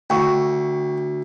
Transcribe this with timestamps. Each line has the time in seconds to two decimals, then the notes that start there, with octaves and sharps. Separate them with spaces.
0.10 D2 G5 C#6